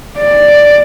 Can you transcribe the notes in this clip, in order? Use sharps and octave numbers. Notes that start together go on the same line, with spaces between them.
D5